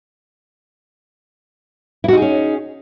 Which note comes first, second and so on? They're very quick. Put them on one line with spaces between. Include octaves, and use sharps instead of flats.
E4 F#4 D#4 G#4 C#4